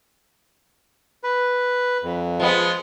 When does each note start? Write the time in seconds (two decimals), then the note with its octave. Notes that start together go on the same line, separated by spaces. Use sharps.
1.24 B4
2.03 F2
2.40 F3 G#3 B3